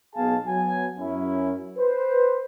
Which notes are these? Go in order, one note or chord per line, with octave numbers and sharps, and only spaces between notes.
B1 B3 G#4 F5 G#5 A5
F#3 B3 G#5
F#2 C#4 E4
B4 C5